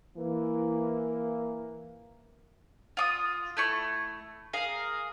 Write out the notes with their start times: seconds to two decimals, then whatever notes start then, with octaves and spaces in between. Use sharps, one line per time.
0.16 E3 A#3
2.97 F4 D6 D#6
3.57 A3 E4 C#6
4.53 G#4 A#4 F5